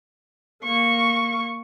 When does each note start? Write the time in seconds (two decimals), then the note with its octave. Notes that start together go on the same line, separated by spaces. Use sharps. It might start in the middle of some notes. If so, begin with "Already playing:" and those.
0.63 A#3 C#6